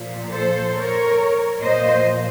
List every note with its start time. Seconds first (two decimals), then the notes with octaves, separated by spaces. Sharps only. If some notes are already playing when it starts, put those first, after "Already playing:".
Already playing: A#2 F3
0.31 A4 C5
0.75 A#4 C#5
1.61 A#2 F3 C5 D#5